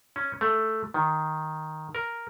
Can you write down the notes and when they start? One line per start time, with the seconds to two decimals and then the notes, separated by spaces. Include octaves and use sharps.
0.16 C#4
0.41 A3
0.94 D#3
1.95 A#4